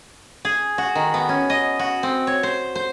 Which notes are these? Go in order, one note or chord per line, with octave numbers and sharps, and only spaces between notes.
G#4
F#4
D#3
B3
C#4
D#5
F#4
C4
C#5
C5
C5